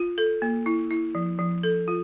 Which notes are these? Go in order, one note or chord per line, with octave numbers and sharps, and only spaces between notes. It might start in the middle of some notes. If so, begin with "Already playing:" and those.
Already playing: F4
A4
A#3
E4
E4
F3
F3
A4
F4